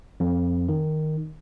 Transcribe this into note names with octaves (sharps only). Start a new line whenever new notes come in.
F2
D#3